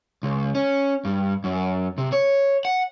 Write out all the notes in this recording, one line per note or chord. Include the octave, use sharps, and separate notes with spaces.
C#2
C#4
G2
F#2
C3
C#5
F#5